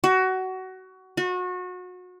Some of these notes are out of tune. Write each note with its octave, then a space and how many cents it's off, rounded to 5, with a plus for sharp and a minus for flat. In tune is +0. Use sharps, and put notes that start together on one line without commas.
F#4 +20
F#4 -30